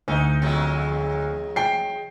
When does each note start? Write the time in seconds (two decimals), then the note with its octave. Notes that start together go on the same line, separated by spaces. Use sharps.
0.08 D2 D#4
0.42 E2 F#3 G#3
1.56 G5 C7